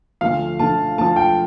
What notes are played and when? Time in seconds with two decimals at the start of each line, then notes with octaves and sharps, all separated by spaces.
0.21 D2 D3 F3 F5
0.59 D2 D3 F3 A5
0.98 D2 D3 F3 A5
1.16 G5